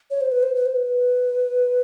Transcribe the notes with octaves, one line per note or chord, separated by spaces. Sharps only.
C#5
C5
B4
C5
B4
C5
B4